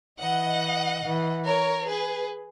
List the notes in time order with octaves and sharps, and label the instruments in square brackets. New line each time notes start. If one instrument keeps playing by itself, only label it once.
[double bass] E3 [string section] D#5 F#5
[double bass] E3
[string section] A#4 C#5
G#4 B4